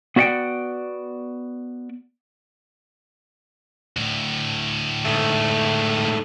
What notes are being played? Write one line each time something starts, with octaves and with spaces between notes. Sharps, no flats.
B3 F#4 D5 E5 F#5 G5
D2 A2
G#2 A3